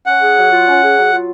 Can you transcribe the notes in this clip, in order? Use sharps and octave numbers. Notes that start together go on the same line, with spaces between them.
C#4 F#5
G#4
F#3
F4
C#4
G#4
F#3
F4